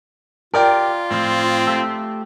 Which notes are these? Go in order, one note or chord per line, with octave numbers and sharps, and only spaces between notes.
F4 G4 A#4 D5 G5
A2 F3 C4
A3 G4 A4